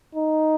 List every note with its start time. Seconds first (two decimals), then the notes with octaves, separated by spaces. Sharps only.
0.15 D#4